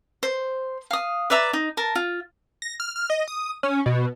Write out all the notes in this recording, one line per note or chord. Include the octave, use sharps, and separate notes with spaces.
C5
F5 D#6
B4 D5 E5 A#5
D#4
A#4 A5
F4
A#6
F6
F6
D#5
D#6
C#4
B2